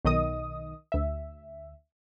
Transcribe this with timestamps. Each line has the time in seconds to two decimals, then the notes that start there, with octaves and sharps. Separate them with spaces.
0.05 B1 D#3 D#5 D#6
0.92 D2 E5